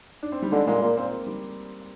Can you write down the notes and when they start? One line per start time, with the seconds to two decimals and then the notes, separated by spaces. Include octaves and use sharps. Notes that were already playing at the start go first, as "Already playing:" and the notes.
0.23 D4
0.32 C4
0.43 G3
0.52 D3 G#3
0.67 A#2 G#3
0.81 A#2 A#3
0.97 A#2 C4
1.27 G3